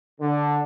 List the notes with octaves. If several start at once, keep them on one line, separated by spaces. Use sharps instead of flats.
D3